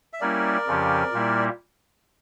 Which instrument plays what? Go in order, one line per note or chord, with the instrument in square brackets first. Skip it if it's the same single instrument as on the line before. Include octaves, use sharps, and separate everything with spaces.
[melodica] E5
[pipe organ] G3 A#3 C#4 E4 [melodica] A#4 D5
[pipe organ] F2 C#3 F3 C#4 G4
A#2 G3 A#3 E4